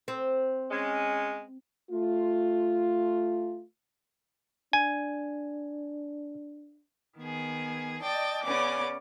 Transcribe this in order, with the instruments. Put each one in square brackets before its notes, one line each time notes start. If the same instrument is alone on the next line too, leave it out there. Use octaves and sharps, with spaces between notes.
[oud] C4
[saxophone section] G#3 C#4
[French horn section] A3 F4
[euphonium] D4 [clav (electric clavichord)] G#5
[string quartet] D#3 B3 G#4
D5 D#5 G5 A5 A6
C#3 B3 C#4 D5 D6